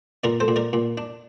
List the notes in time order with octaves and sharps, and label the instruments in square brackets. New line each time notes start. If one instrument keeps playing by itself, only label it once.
[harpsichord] A#2 A#4 D5
A4 C5
A#2
A#4 D5
A#2
D4